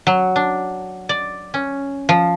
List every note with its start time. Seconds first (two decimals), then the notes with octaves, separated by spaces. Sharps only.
0.07 F#3
0.36 D4
1.09 D5
1.54 C#4
2.09 F3